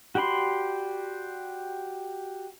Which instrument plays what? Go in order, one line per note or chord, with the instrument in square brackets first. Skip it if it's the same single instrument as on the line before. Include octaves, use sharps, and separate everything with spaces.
[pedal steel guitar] F#4 G4 D5 B5 C6